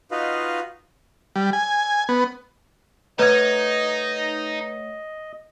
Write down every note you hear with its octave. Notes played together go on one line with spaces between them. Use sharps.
D#4 F4 F#4 B4 D#5 F5
G3
G#5
B3
A3 D#4 B4 C#5 D#5 F#5 G#6